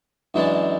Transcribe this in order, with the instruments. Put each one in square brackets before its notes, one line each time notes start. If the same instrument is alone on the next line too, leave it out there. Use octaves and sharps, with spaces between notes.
[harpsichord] F#2 E3 G#3 D4 A4